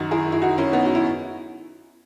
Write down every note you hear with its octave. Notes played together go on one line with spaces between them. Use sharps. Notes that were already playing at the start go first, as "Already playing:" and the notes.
Already playing: F#2 D#3 D#4 F#4
E4 G#4
E4
D#4 F#4
C#4 E4
B3 D#4
F#4
E4